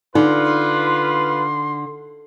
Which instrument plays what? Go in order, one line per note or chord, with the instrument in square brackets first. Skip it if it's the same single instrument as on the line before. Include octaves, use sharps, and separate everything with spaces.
[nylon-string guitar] D3 [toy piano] D#4 [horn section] F4 B4 [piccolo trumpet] C6